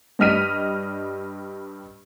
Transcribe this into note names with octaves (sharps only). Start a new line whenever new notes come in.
G2 G3 D#5 F6 B6 D#7